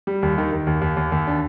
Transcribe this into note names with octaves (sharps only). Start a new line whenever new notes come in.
G3
D#2
D#3
D#3
D#2
D#2
D#2
D#2
D4